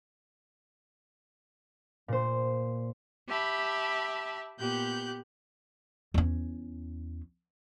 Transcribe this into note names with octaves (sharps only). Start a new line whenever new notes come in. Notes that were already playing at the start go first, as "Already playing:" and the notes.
A#2 C5
G4 E5 A5 B5
A#2 B3 G4 F#6 G6
E2 C#4